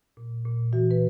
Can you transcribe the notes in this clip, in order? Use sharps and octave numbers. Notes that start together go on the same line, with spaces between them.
A#2
A#2
E3 F#4
B4